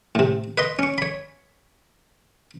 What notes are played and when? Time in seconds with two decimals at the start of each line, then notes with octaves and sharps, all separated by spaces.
0.15 A2 C3
0.58 B4 D#5 C6
0.79 C#4 C#6
0.98 C#5 B5